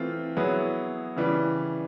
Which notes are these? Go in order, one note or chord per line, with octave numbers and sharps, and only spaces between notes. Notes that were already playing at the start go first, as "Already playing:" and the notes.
Already playing: E3 A3 C4 F4
F#3 B3 E4 G#4
C#3 E3 G3